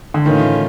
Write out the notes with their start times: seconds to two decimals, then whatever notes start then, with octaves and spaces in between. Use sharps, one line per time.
0.14 D3
0.26 A2 D#3 E3 A3 C#4 F4